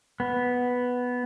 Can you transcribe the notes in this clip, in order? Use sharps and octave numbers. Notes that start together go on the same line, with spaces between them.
B3